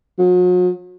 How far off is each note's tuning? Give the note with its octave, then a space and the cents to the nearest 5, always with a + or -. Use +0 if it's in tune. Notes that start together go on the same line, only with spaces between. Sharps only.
F#3 -45